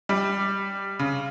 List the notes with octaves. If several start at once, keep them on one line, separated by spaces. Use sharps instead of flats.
G3
C#3